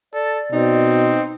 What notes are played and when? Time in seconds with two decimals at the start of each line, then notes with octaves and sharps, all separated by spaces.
0.13 A4 D5
0.53 B2 C4 D#4